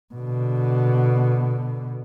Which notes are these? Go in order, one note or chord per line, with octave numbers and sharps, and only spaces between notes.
B2 D3